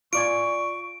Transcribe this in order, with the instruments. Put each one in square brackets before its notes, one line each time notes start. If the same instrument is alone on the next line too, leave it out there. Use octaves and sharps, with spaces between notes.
[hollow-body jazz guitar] F4 D5 G#5 [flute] C#6 [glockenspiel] D7